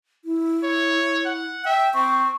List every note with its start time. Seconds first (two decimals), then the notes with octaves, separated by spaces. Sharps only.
0.25 E4
0.63 C#5
1.26 F#5
1.65 E5 G5
1.94 C4 C#6